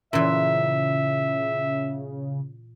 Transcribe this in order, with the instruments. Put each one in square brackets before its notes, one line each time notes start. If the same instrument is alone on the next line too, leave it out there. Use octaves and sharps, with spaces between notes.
[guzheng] A#2 E3 [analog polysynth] C#3 [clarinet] E5